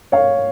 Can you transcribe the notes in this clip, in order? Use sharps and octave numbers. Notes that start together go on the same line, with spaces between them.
C#5 F5